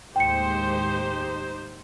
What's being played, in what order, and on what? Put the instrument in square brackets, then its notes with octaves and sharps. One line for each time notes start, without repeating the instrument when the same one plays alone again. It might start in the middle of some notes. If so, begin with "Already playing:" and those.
[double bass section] D#2 A2 G#3 [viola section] D#4 G4 C5 [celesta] G5 C#7